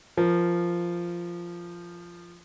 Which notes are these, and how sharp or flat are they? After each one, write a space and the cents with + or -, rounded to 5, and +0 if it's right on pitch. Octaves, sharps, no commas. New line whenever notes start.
F3 -10 A#4 +0